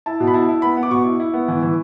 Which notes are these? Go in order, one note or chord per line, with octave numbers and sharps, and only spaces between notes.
E4 A5
B2
B5
E4 A5
E4
B3 B5
B3
D6
B2 C#6
E4
E4
B3
E3
E3